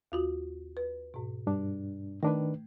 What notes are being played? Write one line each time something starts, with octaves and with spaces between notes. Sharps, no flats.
D#2 F4 F#4
B4
G#2 B2
G2 D4
D#3 A3 D4 B4